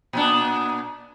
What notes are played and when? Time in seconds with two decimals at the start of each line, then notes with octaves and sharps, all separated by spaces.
0.13 A#2 B3 D4